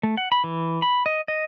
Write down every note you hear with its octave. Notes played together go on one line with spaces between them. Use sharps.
A3
F#5
B5
E3
B5
D#5
D#5